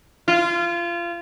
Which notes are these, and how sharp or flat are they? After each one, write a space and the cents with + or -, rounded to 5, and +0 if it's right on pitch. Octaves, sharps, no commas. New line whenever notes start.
F4 -25